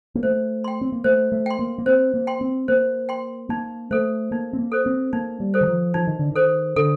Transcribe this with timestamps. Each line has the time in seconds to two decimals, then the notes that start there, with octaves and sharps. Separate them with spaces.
0.15 A#3
0.23 A3 C5
0.64 G5 C6
0.81 C4
0.92 A#3
1.04 A3 C5
1.32 A3
1.46 G5 C6
1.59 A#3
1.78 A#3
1.86 C4 C5
2.14 A#3
2.27 G5 C6
2.41 C4
2.68 A#3 C5
3.09 G5 C6
3.49 A#3 D#4
3.91 A3 A4 C5
4.31 A#3 D#4
4.53 C4
4.59 A#3
4.72 A4 C5
4.86 C4
5.13 A#3 D#4
5.40 G3
5.54 A4 C5
5.61 D#3
5.67 F3
5.94 F3 D#4
6.07 D#3
6.19 D3
6.31 D#3 A4 C5
6.76 D3 A4